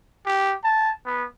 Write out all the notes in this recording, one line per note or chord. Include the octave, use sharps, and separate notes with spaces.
G4
A5
B3